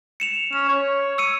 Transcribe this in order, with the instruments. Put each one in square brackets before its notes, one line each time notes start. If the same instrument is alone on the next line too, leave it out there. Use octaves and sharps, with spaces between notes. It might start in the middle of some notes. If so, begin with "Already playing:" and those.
[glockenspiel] C#7 E7 F7
[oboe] C#4 [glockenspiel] E7
[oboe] C#5
[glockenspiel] E6 C#7 D#7